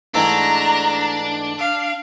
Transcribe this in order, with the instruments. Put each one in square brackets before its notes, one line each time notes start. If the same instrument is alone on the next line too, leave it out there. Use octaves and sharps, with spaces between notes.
[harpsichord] G#2 E3 A3 [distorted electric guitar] D4 [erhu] A#5
[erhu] F5